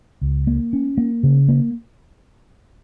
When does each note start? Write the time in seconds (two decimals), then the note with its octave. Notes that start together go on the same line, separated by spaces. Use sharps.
0.21 C#2
0.47 A#3
0.73 C#4
0.97 A#3
1.23 C#3
1.49 A#3